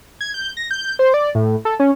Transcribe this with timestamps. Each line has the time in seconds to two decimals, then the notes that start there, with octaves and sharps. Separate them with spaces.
0.21 G#6
0.34 G6
0.57 A#6
0.71 G6
0.99 C5
1.14 D5
1.35 A2
1.65 A4
1.80 C#4